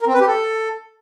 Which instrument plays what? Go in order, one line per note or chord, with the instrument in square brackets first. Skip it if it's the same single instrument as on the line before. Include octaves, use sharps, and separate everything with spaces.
[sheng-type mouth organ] A#4
C4
B4
G4
A4